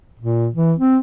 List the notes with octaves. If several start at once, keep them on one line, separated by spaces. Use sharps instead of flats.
A#2
E3
C4